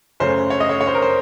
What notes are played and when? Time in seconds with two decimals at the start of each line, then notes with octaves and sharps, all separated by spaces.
0.20 F#2 C#3 A3 C#4 C5
0.50 C#5
0.60 D#5
0.69 C#5
0.81 C#5
0.87 C5
0.95 A#4
1.02 C5